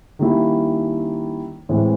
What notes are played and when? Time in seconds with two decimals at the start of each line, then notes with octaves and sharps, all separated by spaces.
0.19 D#3 G3 A#3 C#4 E4
1.69 A2 E3 G#3 C4